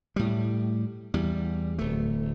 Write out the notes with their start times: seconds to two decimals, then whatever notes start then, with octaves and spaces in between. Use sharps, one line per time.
0.16 A2 G3
1.14 E2 G3
1.79 D1 A3